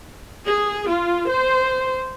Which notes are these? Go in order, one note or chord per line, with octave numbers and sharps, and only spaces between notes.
G#4
F4
C5